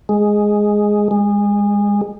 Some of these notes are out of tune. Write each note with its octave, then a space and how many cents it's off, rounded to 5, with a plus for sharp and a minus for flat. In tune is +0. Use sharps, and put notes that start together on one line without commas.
G#3 +0
G#3 -25